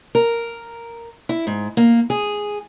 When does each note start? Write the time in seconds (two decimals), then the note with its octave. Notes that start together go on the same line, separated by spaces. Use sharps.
0.15 A#4
1.29 E4
1.47 G#2
1.77 A#3
2.10 G#4